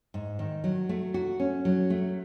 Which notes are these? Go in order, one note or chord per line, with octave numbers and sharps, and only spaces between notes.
G#2
D#3
F#3
A3
F#4
C#4
F#3
A3